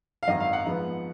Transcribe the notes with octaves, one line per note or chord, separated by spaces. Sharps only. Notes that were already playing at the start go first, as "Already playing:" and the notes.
F5
G#1 F#2 D#3 D#5
F5
F#5
G#2 F3 B3